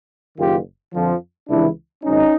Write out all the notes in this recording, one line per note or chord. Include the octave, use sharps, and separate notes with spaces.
F#1 F#2 D#3 F4 G4
F2 D3 F3
C#2 C3 E3 D4 E4
G#1 F#2 D#3 C#4 D#4